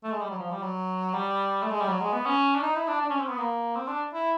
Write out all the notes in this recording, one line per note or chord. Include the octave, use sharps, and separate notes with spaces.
A3
G#3
G3
F#3
F3
G3
F#3
G3
A3
G#3
G3
F#3
G#3
B3
C#4
D4
D#4
E4
D4
D4
C#4
C4
B3
A#3
C4
D4
E4